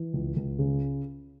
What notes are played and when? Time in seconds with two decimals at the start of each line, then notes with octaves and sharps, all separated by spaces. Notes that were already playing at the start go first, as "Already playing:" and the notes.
Already playing: E3
0.14 C#2
0.36 C#2
0.59 C#3